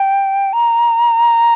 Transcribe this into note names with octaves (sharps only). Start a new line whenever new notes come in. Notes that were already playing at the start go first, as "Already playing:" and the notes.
Already playing: G5
A#5